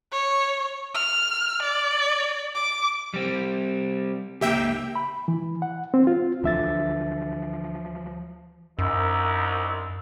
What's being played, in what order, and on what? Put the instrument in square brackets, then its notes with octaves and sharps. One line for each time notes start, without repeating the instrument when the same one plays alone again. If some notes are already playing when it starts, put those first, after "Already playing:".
[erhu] C#5
F6
D5
D6
[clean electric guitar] G3 C4
[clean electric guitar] C#2 A#3 [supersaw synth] G4 E5 G5
[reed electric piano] B5
E3
F#5
C4
F4
[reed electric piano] D2 E5 A6 [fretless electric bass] D3 [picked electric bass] E3 F3
[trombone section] C2 D#4 [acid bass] F#2 [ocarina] E6